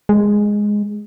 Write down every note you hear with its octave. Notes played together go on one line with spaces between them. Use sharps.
G#3